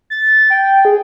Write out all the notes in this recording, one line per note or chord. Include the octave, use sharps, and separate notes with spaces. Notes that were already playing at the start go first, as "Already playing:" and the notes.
A6
G5
G#4